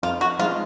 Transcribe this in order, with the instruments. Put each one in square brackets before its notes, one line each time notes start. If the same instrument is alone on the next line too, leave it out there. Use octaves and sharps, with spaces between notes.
[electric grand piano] F2 [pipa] F4
[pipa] F#4
[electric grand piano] F3 G#3 D#4 [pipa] F4